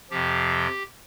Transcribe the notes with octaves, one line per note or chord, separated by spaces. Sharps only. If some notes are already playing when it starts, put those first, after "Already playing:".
F2 C3 F3 G4